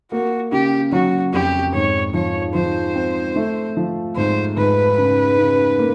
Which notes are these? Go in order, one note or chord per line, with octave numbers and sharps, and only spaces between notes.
A#3 F#4
C#3 G4
F#3 F#4
F2 G4
G#2 C#5
F3 C#5
F3 C5
C4
A3
F3
G#2 C5
G#2 B4
C#3
C#3
A#3